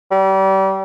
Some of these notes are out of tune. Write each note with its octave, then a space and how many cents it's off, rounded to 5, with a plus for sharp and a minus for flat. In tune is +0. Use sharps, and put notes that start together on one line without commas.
G3 -30